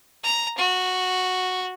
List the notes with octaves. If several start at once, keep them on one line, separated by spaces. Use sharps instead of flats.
A#5
F#4